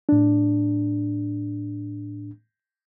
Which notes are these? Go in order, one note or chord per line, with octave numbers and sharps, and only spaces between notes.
A2 D4